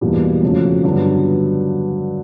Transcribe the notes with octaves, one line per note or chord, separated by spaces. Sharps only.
E2 B2 G3 A#3
F2 C#3 F#3 A3
G2 D3 F#3 B3